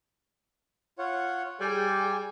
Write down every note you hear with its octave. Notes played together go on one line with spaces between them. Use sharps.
F4 C#5 F#5
G3 G#4 D5 G5 G#5